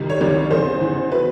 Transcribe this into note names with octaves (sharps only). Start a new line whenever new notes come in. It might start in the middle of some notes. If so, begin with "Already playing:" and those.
Already playing: C2 C3 D#3
C#5
C2 C3 D#3 D5
E2 C#3 E3 C5
E2 C#3 E3
B2 B4